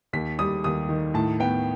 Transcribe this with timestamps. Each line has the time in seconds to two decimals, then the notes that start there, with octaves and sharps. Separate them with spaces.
0.13 D#2 B6
0.39 G3 D#6
0.64 D#2 D#6
0.89 D#3
1.14 A2 A5
1.40 B3 G5